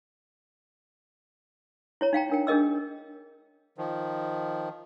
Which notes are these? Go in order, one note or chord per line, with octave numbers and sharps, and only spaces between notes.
E4 C#5 A#5
D#4 F5 G5 A#5
D4 A#4 G5
D4 G#4 A#4 D#5 E6
D#3 F3